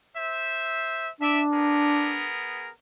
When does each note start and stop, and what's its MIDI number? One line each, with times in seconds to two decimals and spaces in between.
0.16 1.08 72
0.16 1.08 76
1.21 2.28 62
1.21 1.41 74
1.21 1.41 76
1.52 2.70 59
1.52 2.70 68
1.52 2.70 70